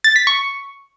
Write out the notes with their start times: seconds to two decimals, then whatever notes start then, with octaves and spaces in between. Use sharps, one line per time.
0.04 A6
0.16 B6
0.27 C#6